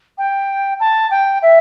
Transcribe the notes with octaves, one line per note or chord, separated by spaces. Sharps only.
G5
A5
G5
E5